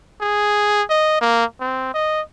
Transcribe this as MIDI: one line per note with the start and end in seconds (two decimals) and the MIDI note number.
0.21 0.83 68
0.90 1.16 75
1.21 1.45 58
1.61 1.91 60
1.94 2.21 75